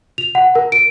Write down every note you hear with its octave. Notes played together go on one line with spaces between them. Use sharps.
F7
F#5
A#4
D7